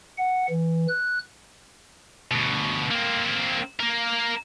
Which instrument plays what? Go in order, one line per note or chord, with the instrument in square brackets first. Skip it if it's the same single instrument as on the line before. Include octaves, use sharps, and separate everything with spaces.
[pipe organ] F#5
E3
F#6
[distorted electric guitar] D2 B2
A#3 C4
A#3 A#4